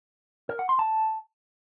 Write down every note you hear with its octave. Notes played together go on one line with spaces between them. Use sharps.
A#4
F#5
C6
A5